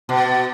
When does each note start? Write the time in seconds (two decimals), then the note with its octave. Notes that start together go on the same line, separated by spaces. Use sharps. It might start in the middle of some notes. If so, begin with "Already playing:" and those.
0.09 B2